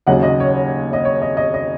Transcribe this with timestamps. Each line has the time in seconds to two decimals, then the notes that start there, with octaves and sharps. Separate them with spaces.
0.07 D#2 C#3 F#3 D#5 F#5
0.23 D#5
0.40 C#5
0.93 D#5
1.05 C#5
1.22 D#5
1.37 D#5
1.54 D#5